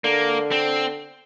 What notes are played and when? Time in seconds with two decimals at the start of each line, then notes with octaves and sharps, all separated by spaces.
0.04 D3 A#3
0.51 C4